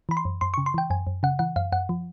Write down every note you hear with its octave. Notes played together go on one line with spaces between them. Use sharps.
E3 B5
C6
F#2
F#2 C6
C#3 C#6
C6
E3 G5
F#2 G#5
F#2
C#3 F#5
E3 F#5
F#2 F5
F#2 F#5
F3